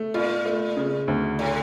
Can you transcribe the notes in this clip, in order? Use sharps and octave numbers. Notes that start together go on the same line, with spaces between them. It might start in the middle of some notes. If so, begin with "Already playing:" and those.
Already playing: A3
A#2 F4
A3
C#3
D2
A2